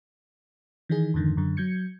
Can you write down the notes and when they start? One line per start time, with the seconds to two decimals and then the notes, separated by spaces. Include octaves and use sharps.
0.89 D#3 E3 D#4 G#4
1.14 F2 G#2 D3 D#3
1.37 F#2 D3
1.57 F#3 G6 G#6 C#7